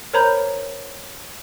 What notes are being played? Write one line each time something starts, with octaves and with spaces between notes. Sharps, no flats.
A#4 C5 C#5 A#5 B5 G6